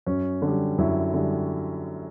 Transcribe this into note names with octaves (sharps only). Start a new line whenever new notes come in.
F#2 C#4
D3
G3
F#2 E4
D3 G3